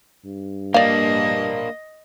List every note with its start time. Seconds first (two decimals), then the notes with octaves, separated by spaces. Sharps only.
0.25 G2
0.74 A#3 D4 D5 D#5 F5